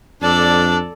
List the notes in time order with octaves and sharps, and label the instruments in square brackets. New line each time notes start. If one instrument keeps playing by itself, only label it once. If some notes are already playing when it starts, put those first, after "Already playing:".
[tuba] F2 [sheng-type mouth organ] D4 [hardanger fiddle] A4 D5